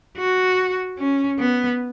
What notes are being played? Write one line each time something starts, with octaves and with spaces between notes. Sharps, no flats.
F#4
C#4
B3